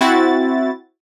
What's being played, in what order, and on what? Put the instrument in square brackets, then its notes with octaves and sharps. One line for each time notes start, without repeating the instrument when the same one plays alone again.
[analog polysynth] C4 E4 F#4 A6